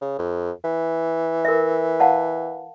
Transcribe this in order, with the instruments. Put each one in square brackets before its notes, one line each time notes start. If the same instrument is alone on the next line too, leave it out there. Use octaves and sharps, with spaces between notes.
[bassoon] C#3
F2
E3
[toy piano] A#4 E5
F5 F#5 A5